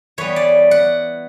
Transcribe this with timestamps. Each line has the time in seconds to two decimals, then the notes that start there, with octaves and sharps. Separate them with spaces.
0.18 E3 G3 B3 C#5
0.36 D5
0.71 F#5